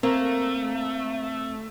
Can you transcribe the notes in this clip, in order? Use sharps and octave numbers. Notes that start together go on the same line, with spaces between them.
A3 A#3 C4